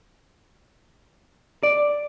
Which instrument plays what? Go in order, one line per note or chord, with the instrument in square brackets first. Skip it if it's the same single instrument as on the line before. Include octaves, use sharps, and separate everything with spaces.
[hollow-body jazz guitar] D5